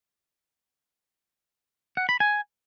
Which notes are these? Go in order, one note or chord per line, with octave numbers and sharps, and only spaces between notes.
F#5
B5
G#5